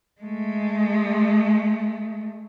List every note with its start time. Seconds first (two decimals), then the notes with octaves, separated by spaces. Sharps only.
0.21 G#3 A3